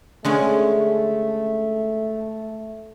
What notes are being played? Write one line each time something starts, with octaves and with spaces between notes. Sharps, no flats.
D3 G#3 A3 C#4